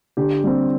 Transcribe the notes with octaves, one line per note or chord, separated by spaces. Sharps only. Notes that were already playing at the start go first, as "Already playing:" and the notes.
D3 G4
G3 C4